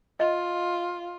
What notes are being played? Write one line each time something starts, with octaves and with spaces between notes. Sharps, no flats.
F4 D#5